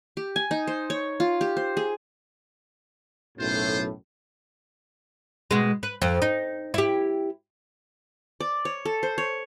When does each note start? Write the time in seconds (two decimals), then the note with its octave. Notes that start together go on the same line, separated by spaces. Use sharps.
0.17 G4
0.36 G#5
0.51 D#4
0.68 C5
0.90 C#5
1.20 F4
1.41 G4
1.57 C5
1.77 G#4
3.38 B1 F#2 A2 F4 C5
5.51 B2 G#3
5.83 B4
6.02 F2
6.22 D#4
6.74 E4 G4
8.40 D5
8.65 C#5
8.85 A4
9.03 C5
9.18 C#5